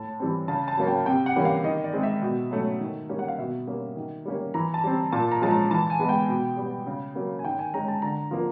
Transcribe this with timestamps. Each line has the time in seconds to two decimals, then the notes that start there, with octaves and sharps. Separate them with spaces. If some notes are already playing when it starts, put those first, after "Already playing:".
Already playing: A2 A5
0.20 E3 G3 C4
0.48 C#3 A5
0.68 A5
0.77 F#3 A#3 C#4
0.87 G5
1.06 C3 G5
1.26 F#5
1.36 E3 G3 A#3 C#4
1.45 F5
1.64 D#3 D#5
1.84 D5
1.93 G#3 C4
2.03 E5
2.22 B2
2.51 F#3 A3 C#4
2.80 D#3
3.09 G3 A#3 C#4
3.19 F#5
3.28 F5
3.39 B2 E5
3.67 G3 A#3 C#4
3.96 D#3
4.25 G3 A#3 C#4
4.54 E3 A#5
4.74 A5
4.84 G3 C4
5.12 A#2 A5
5.32 A#5
5.42 F3 G#3 C#4 A5
5.51 A#5
5.70 E3 A5
5.90 G#5
5.99 G#3 B3
6.09 G5
6.28 B2
6.57 G3 B3
6.87 C#3
7.15 F#3 A#3 C#4
7.39 G#5
7.45 D#3 G5
7.59 G#5
7.73 G#3 C#4 A#5
7.88 A5
8.02 D3 A#5
8.31 F3 A#3